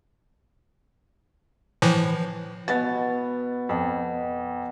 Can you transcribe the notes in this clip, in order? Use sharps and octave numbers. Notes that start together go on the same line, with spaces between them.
A2 E3 F3
B2 B3 A6
F2